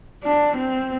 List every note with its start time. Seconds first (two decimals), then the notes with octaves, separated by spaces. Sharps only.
0.23 D4
0.57 C4